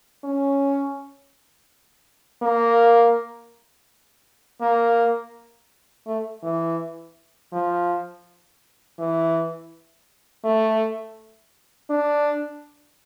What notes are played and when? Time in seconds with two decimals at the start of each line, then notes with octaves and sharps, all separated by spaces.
0.24 C#4
2.43 A#3
4.61 A#3
6.07 A3
6.44 E3
7.53 F3
8.99 E3
10.44 A3
11.90 D4